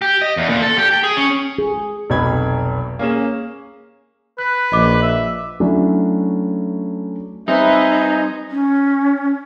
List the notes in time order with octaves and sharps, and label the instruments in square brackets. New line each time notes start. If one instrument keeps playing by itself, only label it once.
[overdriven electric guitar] G4
D#5
E2
A#2
A4
G4
G5
G#4
C#4
[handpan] G#4
[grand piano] F1 B1 B2 B3 B5 G#6
A#3 C#4 G#4 E7
[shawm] B4 [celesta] F#6
[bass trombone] A#1 [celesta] D#5 D6
[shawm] E5
[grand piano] F#3 A3 C#4 D4 E4
[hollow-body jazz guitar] G3 C4 [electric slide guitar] D#4 [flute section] B4 E5 [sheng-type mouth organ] C5 G#5 A#5
[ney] C#4